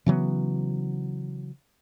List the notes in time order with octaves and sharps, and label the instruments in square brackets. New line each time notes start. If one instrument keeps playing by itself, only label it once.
[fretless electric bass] C#3 E3 F#3 B3